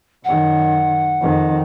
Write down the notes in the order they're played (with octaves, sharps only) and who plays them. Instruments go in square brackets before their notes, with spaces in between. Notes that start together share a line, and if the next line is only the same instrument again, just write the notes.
[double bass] F#2 D#3 [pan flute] F#5
[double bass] F2 D#3